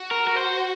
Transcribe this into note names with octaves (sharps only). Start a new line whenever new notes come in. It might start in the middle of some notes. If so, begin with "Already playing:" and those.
Already playing: F#4
A#4
A#4
C5